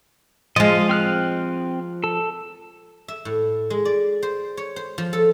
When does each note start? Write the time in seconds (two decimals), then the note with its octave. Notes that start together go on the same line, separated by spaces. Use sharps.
0.56 F3 G#3 D#5 F5
0.89 C4 F6 F#6
2.04 A4
3.08 E5
3.25 A2
3.70 G#3
3.85 D5
4.23 C5
4.57 C#5
4.76 C5
4.98 F3
5.13 A4